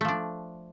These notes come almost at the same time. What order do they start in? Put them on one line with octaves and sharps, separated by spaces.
A3 F3 D4